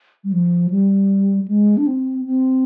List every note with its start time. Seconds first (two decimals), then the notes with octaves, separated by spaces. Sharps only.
0.24 G3
0.32 F3
0.70 G3
1.48 G#3
1.77 D4
1.87 C4
2.26 C4